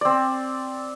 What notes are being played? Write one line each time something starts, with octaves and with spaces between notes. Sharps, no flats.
C4 D5